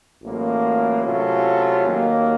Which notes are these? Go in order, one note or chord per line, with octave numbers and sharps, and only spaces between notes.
A1 A2 F#3 A#3 F4
C3 F#3 A3 C#4 F4
D#2 D#3 F#3 A#3